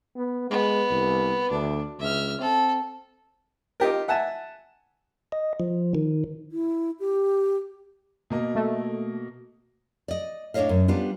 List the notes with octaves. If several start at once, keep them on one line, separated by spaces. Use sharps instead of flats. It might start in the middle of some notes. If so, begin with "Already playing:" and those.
B3
G#3 B3
C2
D2 D4
C#2 E5 F6
C4 A4
D#4 F4 G4 A#4
E5 F#5 G#5 A5
D#5
F3
D#3
E4
G4
B2 A#3 D#5
A3
D5 D#5
A2 D4 G#4 C#5 D#5 F5
F#2
G3 B3 D4 F4